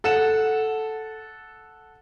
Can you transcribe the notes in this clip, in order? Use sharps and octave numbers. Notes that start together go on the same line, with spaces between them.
A4 F#5 E7